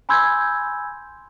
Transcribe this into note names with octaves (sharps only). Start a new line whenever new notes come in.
G#5 B5 C6 E6 G6 G#6